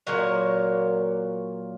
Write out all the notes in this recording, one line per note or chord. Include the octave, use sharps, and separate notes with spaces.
A#2 F#3 A#3 C#5